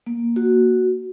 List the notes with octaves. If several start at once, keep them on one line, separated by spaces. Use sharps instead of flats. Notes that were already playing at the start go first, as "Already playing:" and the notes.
A#3
F#4